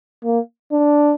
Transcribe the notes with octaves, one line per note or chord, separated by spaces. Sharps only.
A#3
D4